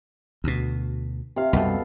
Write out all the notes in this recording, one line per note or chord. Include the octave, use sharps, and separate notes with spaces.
D2 B2
C3 F5
C2 F#2 B2 A4